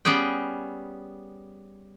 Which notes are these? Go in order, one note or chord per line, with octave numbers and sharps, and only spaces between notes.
G3 B3 C#4 G#4 G5